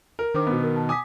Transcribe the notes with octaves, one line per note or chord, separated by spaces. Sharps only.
A#4
D#3 D4 C5 D6
B2 B3
A#4
A5
G#5 D6 D#6 B6